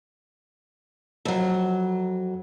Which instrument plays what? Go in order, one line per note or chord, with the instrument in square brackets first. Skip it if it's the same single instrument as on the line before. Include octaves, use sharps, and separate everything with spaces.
[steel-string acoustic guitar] F2 F#3